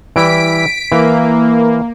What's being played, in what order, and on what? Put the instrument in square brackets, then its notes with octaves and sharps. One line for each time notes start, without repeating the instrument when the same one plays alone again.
[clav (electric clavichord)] E3 G3 E4 [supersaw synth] B6 D7
[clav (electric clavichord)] E3 [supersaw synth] A#3